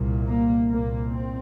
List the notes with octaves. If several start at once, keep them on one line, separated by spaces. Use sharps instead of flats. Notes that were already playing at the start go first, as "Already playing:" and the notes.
Already playing: C2 A#2
A#3
C2 A#2 A#3
C4